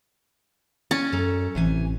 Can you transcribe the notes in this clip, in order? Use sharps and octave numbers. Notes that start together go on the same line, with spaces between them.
C#4 D5
F#2 A4 A#5
A1 C3 E3 G#5